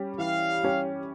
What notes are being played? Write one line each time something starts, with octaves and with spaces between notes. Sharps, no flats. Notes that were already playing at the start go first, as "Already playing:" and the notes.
Already playing: G3 C#4 G4
E3 F5
G3 C#4 G4